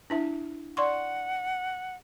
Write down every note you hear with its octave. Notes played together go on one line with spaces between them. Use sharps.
D4 E4 E5
D5 F#5 C6 C#6